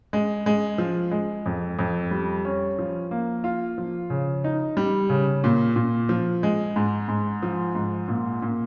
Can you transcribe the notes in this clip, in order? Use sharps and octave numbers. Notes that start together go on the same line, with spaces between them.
G#3
G#3
F3
G#3
F2
F2
G3
C#4
F3
A#3
F4
F3
C#3
D#4
G3
C#3
A#2
A#2
F3
G#3
G#2
G#2
F3
G#2
A#2
A#2